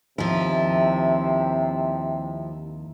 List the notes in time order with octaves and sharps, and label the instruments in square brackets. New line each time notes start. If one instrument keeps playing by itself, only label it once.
[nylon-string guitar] D#2 [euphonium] C3 [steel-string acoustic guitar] F3 E4